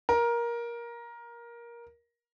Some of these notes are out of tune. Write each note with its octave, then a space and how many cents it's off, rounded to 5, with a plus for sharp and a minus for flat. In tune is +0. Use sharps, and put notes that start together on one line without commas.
A#4 +15